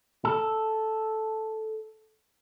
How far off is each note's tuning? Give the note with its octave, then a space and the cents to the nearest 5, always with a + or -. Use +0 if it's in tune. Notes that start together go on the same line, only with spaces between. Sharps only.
A4 -5